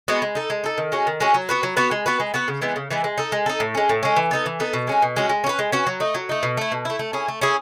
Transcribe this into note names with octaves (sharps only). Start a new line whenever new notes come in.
G#3 B3 F#4
G#3
D#4 A4
G#3
D#4 A4
D#3
G#3 C#4 F#4
D#3
G#3 C#4 F#4
F#3
B3 F#4 B4
F#3
B3 F#4 B4
G#3
B3 F#4 B4
G#3
B3 F#4 B4
C#3
E3 G#3 B3
C#3
E3 G#3 B3
G#3
D#4 A4
G#3
D#4 A4
A2
G#3 C#4
A2
G#3 C#4
E3
B3 D#4 A4
E3
B3 D#4 A4
B2
G#3 C#4 F#4
B2
G#3 C#4 F#4
G#3
C#4 F#4
B4
G#3
C#4 F#4 B4
F#3
A3 D#4
F#3
A3 D#4
B2
A3 E4
B2
A3 E4
A3
C#4 E4 G#4
A3
C#4 E4 G#4